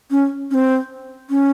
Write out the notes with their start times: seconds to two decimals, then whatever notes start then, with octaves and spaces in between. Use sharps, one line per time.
0.11 C#4
0.51 C#4
0.54 C4
1.30 C#4